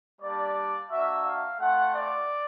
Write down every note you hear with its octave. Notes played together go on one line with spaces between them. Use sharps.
G3 A#3 D4 D5
A#3 D4 F#4 E5
F5
A3 C4 F4 F#5
D5